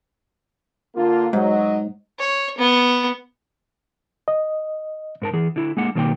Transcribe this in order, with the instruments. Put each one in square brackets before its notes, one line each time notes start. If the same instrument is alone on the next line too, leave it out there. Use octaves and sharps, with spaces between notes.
[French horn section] D3 A#3 F4
[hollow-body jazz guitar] G#2 [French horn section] F#3 D#5
[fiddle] C#5
B3
[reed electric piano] D#5
[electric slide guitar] G#2 A#4 A5
E3 G#4
D3 E4
G#3 A#3 F#5
B2 D#3 F#3 A#3 C#5 G5